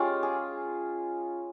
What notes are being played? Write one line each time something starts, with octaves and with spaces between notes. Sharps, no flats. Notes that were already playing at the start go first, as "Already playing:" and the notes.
Already playing: G#3 C#4 F4 G4
G#4